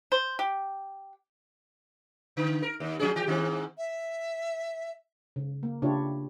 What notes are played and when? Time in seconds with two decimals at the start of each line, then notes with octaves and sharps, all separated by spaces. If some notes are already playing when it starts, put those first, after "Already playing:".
0.12 C5
0.39 G4
2.37 D3
2.62 A#4
2.80 D#2
2.99 F3 C#4 G#4
3.16 E3 G4
3.27 G#2 D#3 C4
3.78 E5
5.36 C#3
5.63 A#3
5.82 C#3 D4 E4 F4 G4 C#5